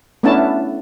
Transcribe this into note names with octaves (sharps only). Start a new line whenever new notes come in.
A3 B3 C#4 D4 E4 A5